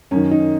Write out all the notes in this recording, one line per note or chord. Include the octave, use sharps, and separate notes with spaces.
F#2 D#3 C#4
D#4